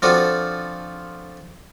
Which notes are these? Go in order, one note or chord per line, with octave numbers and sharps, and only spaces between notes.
F3 C4 D4 F4 F#4 A4